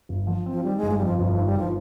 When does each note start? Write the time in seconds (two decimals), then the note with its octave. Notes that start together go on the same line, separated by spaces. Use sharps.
0.09 G1
0.27 F3
0.46 C4
0.51 F3
0.64 D#3 G3
0.77 G#3
0.82 G1
0.91 G#3
0.98 G3
1.00 F2 F3
1.18 G1 F3
1.32 D#3 F3
1.46 G3
1.54 G1 F3